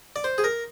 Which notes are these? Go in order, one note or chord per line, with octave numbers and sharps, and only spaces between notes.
D5
C5
G#4
A#4